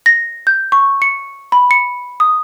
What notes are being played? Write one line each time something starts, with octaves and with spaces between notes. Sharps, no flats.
A#6
G6
C#6
C#7
B5
C#7
D#6